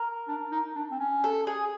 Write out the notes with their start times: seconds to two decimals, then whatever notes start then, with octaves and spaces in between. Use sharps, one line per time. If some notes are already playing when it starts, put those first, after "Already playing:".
Already playing: A#4
0.28 D4
0.52 D#4
0.76 D4
0.91 C4
1.00 C#4
1.24 A4
1.47 G#4